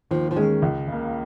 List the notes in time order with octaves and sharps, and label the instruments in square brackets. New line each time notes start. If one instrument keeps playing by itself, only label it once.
[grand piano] D#2 [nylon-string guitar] F3
[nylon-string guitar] F3
[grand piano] D#3 C#4 [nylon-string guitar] G#3
[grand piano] C#2
C#3 A#3